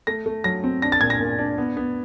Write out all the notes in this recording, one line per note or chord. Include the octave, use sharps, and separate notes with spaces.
A3 A#6
A3
F#3 A#6
C4
D4 A#6
A6
A#2 G#6
A#6
A#2
D4
B3
B3